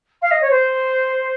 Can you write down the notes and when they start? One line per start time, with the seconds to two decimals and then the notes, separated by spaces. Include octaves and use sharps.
0.21 F5
0.31 D#5
0.41 C#5
0.50 C5